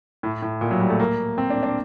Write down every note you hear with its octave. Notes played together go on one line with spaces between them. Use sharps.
A2
A2
A#2
F#3
G3
A3
A#3
C4
D4
D4